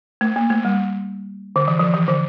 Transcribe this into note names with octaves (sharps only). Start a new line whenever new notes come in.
A3
A#3
A3
G3
D3
E3
F3
E3
D3